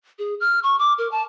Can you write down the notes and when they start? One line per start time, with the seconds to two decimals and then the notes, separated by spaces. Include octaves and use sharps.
0.19 G#4
0.40 F6
0.63 C#6
0.79 D6
0.98 A#4
1.11 A5